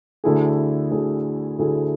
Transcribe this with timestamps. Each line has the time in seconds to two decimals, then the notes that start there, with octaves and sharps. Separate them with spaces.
0.24 D2 D3 A3 E4 G#4
0.91 D2 D3 A3 E4 G#4
1.59 D2 D3 A3 E4 G#4